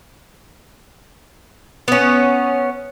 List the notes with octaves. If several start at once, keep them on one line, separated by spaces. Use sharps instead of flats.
B3 C#4